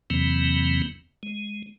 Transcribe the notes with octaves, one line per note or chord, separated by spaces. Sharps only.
E2 C3 E3 F#3 A#3 C4
G#3